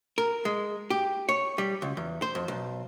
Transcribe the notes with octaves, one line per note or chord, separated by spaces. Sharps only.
A#4
G#3
G4
C#5
G3
C#2
E2
C5
F2
B1